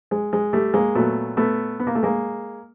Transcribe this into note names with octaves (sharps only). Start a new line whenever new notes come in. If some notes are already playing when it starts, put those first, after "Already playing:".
G#3
G#3
G3 A3
G#3 A#3
A#2 F#3 A3 B3
A3 B3
B3
A#3
A3
G#3 A#3